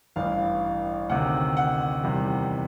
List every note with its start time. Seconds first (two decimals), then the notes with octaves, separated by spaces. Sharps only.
0.16 A1 G2 E3 F5
1.09 D2 C3 D#3 F#5
1.57 F#5
2.03 E2 C3 D#3 G3